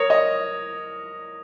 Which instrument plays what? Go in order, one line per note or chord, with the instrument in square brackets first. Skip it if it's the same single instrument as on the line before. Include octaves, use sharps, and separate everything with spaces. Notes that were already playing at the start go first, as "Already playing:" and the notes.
Already playing: [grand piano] A#4 C#5 [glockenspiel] D#6 A#6 F7
[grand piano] D#5